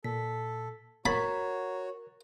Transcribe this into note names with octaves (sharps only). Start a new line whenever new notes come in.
A#2 A4 B6
F#4 A#4 C#5 F#5 A#5 B5 G#6 A6